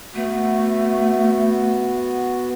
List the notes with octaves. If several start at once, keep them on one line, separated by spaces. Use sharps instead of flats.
A3 B3 F#4